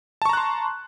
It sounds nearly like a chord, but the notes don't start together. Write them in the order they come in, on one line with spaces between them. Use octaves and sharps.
A5 C#6 A#5 F#6 C6